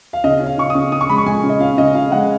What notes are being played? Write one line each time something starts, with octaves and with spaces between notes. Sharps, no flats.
F5
C#3 D#5
C#4
F5
C#3 C#6
D#6
C#3
C#3 D#6
C#6
G#3 B5
C#6
G#3 G#5
C#3
D#5
C#4 F5
C#3 D#5
C#3 F5
G#3 F#5